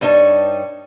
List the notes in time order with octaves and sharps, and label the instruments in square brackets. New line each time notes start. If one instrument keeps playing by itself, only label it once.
[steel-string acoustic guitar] G2 G3 D#4 C#5 A5